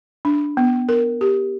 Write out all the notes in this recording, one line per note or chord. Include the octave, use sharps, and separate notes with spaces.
D4
B3
A#4
G4